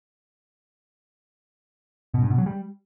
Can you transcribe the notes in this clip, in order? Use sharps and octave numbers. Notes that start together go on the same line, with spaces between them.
B2
G2
B2
F#3
G3